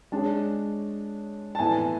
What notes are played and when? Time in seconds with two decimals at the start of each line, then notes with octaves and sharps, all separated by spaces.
0.12 G#3 D4 G#4 C#5 A5
1.55 A5
1.59 A2 E3 B3 E4 G#5